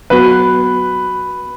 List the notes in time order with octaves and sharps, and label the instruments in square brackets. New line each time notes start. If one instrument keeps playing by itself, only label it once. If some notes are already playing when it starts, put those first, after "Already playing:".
[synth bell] F#3 B3 F#4 [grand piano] B4